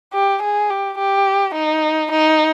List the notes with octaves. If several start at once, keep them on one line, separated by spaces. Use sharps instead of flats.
G4
G#4
G4
G4
D#4
D#4